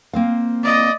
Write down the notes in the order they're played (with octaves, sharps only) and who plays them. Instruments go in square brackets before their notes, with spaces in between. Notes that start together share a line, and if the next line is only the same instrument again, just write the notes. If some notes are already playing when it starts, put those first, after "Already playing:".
[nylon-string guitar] A#3 C4 F5
[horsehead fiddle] D5 D#5